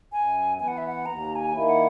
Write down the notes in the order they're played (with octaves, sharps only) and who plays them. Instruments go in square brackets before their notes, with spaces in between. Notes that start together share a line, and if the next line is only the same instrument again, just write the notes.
[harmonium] F#2 [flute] G#5
[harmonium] E3 B3 [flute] G#5
[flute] F#5
E5
F#5
[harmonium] D#2 [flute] A#5
[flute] G#5
[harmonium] D#3 A#3 E4
[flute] F#5